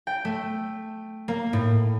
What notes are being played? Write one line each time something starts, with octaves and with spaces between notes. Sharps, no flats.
G5
A3
A#3
A2